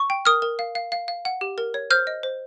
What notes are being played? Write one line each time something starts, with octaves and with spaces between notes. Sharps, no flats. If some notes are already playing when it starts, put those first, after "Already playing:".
Already playing: C#6
G5
A#4 D#6 F6
A#4
F5
F5
F5
F5
F#5
G4
A#4
C#5
C5 F6 G6
D#5
C5